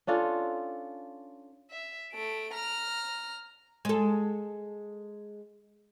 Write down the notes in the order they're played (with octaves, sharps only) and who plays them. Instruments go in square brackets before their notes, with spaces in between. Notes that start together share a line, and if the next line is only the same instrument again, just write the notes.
[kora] C#4 D4 F4 A4
[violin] E5
A3 D7
A#5 F6
[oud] G#3 A4